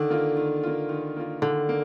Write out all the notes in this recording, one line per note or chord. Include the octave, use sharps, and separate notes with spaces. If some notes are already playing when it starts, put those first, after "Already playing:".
Already playing: D3 D#3
A#3 F4
D#3
A#3 F4
D#3
A#3 F4
D3 D#3
A#3